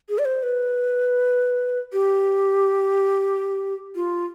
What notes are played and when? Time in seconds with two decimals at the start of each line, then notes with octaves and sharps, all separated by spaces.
0.09 G#4
0.18 D5
0.25 C5
0.43 B4
1.93 G4
3.95 F4